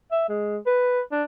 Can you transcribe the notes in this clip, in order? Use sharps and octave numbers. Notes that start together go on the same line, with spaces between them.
E5
G#3
B4
D4